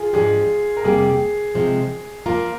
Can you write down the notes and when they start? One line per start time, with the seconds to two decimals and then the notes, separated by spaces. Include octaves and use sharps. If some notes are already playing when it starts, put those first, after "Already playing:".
Already playing: F4 G#4
0.13 G#2 F3 G#3 D4 G4 G#4
0.77 A#4
0.84 F2 C3 G3 A#3 G#4
1.55 C3 F3 G#3 C4
2.26 F3 A#3 F4 A#4